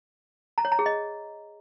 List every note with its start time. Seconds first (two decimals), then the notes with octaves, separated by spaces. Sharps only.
0.58 A#5
0.65 C#5
0.72 A#5
0.79 G#4
0.86 D#5